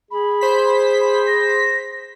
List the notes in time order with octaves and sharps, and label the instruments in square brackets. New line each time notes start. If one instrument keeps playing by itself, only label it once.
[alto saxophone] G#4 [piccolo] B5
[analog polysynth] C5 B6
[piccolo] B5
A#6